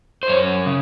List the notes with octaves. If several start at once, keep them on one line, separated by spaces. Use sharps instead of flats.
C5
F#2 C#5
C#3